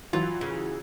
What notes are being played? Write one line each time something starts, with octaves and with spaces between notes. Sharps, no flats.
E3 F#3 F4
C#3